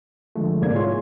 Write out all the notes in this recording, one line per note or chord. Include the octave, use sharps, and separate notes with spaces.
D3 F3 G#3 A3
G#2 C3 A#3 D5 G#6
E4 F4 G#4 C#5 C6